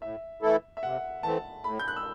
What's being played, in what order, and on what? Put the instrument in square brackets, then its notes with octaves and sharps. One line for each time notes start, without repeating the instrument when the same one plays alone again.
[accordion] A2 [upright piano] E5
[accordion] E3 A3 E4 A4
[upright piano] E5
[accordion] C3 [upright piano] F#5
[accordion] E3 A3 C4 [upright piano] A5
[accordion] A2 [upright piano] B5
[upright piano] G6
F#6
E6